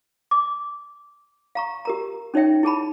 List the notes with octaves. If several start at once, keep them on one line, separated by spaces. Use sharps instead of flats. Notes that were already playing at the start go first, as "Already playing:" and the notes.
D6
F5 A#5 C#6
G4 A#4 A#5
C#4 D#4 C#5 E5 G5
E4 G#4 A5 B5